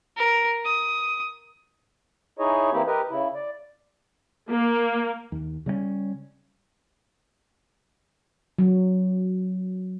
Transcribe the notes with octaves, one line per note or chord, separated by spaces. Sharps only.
A#4
D#6
D#4 E4 G#4 C#5 D#5
E3 A#3 C4 E4 G4
G4 A#4 B4 D#5
C#3 E4
D5
A#3
D#2
C#3 G3 A#3 C#4
F#3